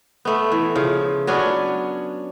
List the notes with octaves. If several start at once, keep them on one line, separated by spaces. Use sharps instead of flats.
A3 B3
E3
C#3 F3
F#3 B3 C#4 D4